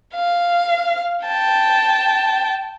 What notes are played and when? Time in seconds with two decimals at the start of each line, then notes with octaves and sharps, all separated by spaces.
0.15 F5
1.25 G5 A5